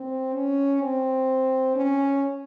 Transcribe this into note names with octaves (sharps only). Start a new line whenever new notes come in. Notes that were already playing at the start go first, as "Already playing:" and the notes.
Already playing: C4
C#4
C4
C#4